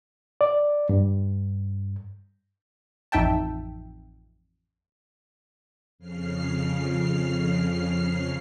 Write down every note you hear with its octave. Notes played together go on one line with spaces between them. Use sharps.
D5
G2
A1 F2 D#4 E5 G5 A5
F2 C#3 F6 C7